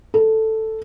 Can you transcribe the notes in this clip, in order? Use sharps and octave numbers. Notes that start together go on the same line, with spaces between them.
A4